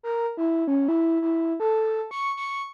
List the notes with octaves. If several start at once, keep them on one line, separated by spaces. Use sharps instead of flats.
A#4
E4
C#4
E4
E4
A4
C#6
C#6